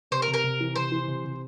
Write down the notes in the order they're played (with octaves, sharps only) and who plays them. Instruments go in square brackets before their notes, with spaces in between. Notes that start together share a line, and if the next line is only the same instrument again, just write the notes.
[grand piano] C3 [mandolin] C5
[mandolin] A#4
[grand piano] C3
[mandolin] A#4
[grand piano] C3
E3
[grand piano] C3 [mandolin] C5
[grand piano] E3
C3
C3